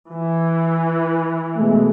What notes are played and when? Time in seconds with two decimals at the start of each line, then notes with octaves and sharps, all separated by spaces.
0.10 E3
1.56 B2 G#3 A3